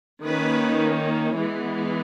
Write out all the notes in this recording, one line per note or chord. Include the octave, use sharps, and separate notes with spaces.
D#3 A#3 C#4 B4
E3 G#3 B3